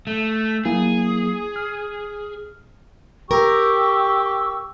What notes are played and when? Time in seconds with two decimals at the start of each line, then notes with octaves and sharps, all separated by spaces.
0.07 A3
0.65 F#3 A#3 E4 G#4
1.56 F6
3.31 G4 A#4 C#6 E6